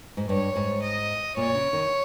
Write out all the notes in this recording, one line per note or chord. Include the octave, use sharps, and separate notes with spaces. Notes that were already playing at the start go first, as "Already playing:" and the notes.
G#2
G2 C#5
G#2
D#5
A#2 C#5
C#3
D#3